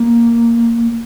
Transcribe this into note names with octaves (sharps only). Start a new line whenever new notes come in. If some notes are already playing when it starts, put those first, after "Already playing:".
Already playing: A#3